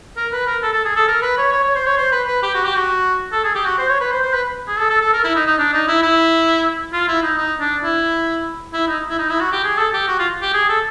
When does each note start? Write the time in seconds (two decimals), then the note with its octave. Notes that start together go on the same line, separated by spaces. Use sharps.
0.17 A#4
0.32 B4
0.47 A#4
0.63 A4
0.73 A4
0.85 G#4
0.96 A4
1.08 A#4
1.22 B4
1.38 C#5
1.53 C#5
1.64 C#5
1.75 C5
1.86 C#5
1.97 C5
2.12 B4
2.27 B4
2.42 G4
2.54 F#4
2.65 G4
2.76 F#4
3.32 A4
3.44 G#4
3.55 G4
3.66 F#4
3.78 C5
3.89 C#5
4.00 B4
4.11 C5
4.22 C5
4.33 B4
4.67 G#4
4.78 A4
4.90 A4
5.01 A4
5.13 A#4
5.24 E4
5.36 D#4
5.46 D#4
5.58 D4
5.73 D#4
5.88 E4
6.03 E4
6.93 F4
7.08 E4
7.23 D#4
7.38 D#4
7.60 D4
7.83 E4
8.73 E4
8.88 D#4
9.09 E4
9.19 D#4
9.30 E4
9.41 F#4
9.52 G4
9.64 G#4
9.78 A4
9.93 G4
10.08 F#4
10.19 F4
10.41 G4
10.54 G#4
10.69 A4